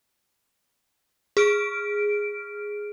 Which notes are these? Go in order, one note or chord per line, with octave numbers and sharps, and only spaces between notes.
G#4 F6 D7